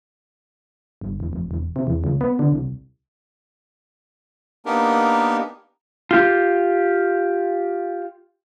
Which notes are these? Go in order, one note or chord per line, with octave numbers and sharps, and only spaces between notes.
G1
E1
F1
E1
C3
E2
C#2
B3
D3
C2
A#3 B3 D4 D#4 G4 A#4
F4 G4